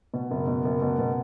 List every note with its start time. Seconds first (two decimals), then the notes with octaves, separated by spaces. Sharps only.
0.14 B2
0.31 F#1
0.48 B2
0.65 F#1
0.82 B2
0.99 B2